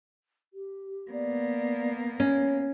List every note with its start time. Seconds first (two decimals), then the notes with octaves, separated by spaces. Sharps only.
0.53 G4
1.11 A#3 B3 D5
2.20 C#4 C#5